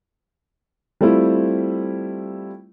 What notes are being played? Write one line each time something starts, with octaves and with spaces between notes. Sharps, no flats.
G3 A3 C4 E4 F4